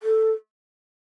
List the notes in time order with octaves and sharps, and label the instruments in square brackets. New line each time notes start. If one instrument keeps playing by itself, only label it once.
[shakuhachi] A4